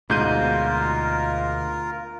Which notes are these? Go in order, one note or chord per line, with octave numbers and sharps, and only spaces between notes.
D2 G#2 B2 F4 A#4 G6 D#7